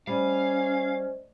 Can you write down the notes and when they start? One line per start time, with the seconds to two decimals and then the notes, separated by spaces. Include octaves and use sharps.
0.07 G3 C#4 C5 D5 D#5 F5